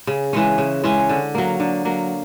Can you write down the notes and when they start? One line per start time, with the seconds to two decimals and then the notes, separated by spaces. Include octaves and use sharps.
0.07 C#3
0.33 E3 G#3 C#4
0.58 C#3
0.84 E3 G#3 C#4
1.09 D3
1.35 F#3 A#3
1.60 D3
1.85 F#3 A#3